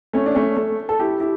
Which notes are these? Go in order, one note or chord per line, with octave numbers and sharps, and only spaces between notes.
A3 C#4
D4
A3 C#4
A3
A4
E4 G4
E4 G4